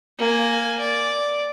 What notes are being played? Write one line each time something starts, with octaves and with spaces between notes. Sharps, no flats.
A#3 G#5
D5